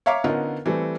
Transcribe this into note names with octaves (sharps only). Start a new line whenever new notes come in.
C#5 E5 F5 A#5 C#6 D6
D3 B3 C#4 D#4 F4 A#4
E3 G3 A3 C4